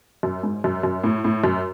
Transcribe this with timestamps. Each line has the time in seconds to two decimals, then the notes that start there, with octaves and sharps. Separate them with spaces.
0.23 F#2
0.43 G#2
0.64 F#2
0.83 F#2
1.04 A2
1.24 A2
1.44 F#2